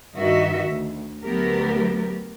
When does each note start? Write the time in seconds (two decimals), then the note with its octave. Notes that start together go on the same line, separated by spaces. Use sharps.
0.16 G2 D#3 F#4 D#5 E5
0.66 D2
1.24 D2 F#3 A3 B3 G4 A#4